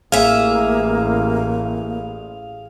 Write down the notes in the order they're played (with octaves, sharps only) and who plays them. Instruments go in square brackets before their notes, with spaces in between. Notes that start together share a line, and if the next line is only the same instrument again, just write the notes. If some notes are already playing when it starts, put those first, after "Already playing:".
[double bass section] A1 [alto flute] A#3 [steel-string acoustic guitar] G#4 E5 [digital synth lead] F5